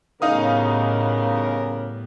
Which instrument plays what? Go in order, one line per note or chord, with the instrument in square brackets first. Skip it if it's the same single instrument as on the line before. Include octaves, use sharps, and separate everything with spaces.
[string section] A2 G3 B3 [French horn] C#3 [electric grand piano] D#4 F5 D#6 [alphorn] A#4